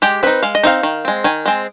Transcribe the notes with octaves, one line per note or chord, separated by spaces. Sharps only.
G#3 G4
C4 D#4 B4
G#3 F5
D#5
C4 D#4 F5
D#3
G#3 C4
D#3 G#5
G#3 C4